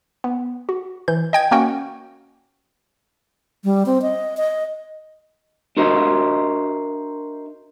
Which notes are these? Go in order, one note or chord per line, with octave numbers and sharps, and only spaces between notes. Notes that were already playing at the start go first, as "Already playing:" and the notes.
B3
F#4
E3 G6
D#5 G5 G#6
A#3 C#4 F#4 G5
G3
C4
D#5
D#5
D4 F#4 A#4 C5 D#5 E5